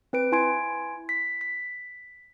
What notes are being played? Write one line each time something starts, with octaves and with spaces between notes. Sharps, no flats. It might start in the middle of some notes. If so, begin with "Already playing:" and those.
C4 B4 D7
E4 G#5 C6 G#6 D7
B6
B6